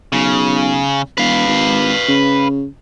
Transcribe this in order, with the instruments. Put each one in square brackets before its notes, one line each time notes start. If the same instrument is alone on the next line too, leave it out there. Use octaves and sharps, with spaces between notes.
[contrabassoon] B1 [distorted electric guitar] C#3
[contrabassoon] E1 [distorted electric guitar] B4 F5
[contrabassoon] G#1
C#3